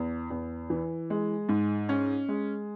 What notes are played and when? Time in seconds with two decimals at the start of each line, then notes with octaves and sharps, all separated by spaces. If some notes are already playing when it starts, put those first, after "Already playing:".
Already playing: E2
0.30 E2
0.70 E3
1.10 G#3
1.49 G#2
1.89 C#4
2.28 G#3